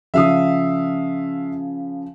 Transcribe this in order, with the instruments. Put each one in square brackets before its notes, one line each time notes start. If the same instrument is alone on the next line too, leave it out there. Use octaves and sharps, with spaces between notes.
[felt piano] C#3 F3 [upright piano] E5 F5 D#6